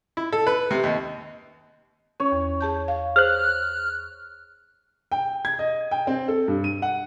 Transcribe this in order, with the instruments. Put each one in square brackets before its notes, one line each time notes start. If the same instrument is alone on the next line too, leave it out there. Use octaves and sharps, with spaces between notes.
[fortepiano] E4
A4
B4
C3
D#2
[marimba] C#4 [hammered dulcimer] C#5
[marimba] E2
G#4 A5 G6
F5
[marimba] G#4 C5 [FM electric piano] F6 F#6
[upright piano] G5
G#6
D#5
G5
C4
A4
G2
D#7
F#5